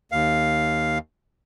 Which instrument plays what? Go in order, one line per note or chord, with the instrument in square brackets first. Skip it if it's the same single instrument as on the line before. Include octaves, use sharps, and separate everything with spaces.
[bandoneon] D#2 F5